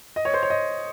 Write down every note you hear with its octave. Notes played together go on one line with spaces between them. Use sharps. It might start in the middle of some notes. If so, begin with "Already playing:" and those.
D#5
C#5
C5
C#5
D#5